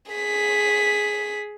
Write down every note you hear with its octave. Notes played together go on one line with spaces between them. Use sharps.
G#4 B6